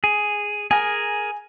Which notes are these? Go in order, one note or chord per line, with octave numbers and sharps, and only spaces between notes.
G#4
G#4 A#4 G#5